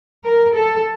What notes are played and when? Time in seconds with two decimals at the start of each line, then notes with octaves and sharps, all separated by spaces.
0.24 A#4
0.54 A4